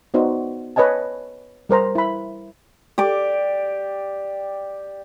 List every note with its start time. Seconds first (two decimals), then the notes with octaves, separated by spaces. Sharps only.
0.14 B3 D#4 F#4 C5 D5
0.76 B4 C#5 D#5 G#5 A5
1.69 G3 A#4 C5 A#5
1.95 E4 B5
2.98 G4 D5 D6